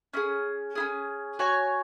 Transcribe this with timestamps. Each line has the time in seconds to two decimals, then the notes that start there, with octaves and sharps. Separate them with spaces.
0.14 C#4 E4 G#4
0.75 C#4 E4 G#4
1.39 F#4 C#5 G#5